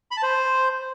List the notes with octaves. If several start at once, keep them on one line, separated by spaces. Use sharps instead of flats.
B5
A5
C5